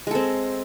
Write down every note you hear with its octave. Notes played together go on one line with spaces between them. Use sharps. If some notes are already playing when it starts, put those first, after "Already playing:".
G#3 C4 A4